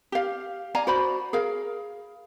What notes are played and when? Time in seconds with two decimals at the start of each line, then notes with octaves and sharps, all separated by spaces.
0.12 G4 F5
0.75 D5 F5 G#5 A#5
0.87 F#4 C5 D5 B5
1.33 G#4 A#4 F5